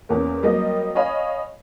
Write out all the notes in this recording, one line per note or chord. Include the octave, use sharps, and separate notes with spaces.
E2 A#3 C#4
F#3 G3 A#3 C4 D#5
C#5 D#5 F5 G#5 B5